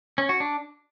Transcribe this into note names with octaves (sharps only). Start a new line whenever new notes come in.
C#4
F#4
D4